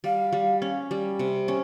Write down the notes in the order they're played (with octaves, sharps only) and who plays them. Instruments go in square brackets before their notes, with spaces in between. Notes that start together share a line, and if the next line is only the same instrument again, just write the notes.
[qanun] G3 [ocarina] F5
[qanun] G3
C#4
G3
C3
C#4